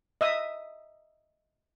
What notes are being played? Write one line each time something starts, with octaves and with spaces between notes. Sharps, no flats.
D#5 E5 D#6